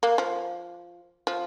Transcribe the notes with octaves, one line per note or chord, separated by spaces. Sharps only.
A#3
F3
F3